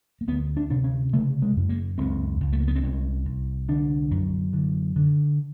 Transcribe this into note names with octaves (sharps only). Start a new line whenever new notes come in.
A#3
D2 B3
D4
C3 D4
C#4
C#3 A3
G#3
F#2
A#3
C#2 C4
C#2
A3
A#3
B3
C4
C2 C#4
C2
D3 D4
F#2
D3
D3